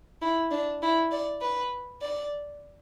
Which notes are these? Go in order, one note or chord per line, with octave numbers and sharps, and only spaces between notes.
E4
D4
E4
D5
B4
D5